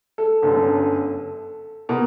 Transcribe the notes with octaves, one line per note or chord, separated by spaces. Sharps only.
A4
G1 F#2 D3 A4
B2 A#4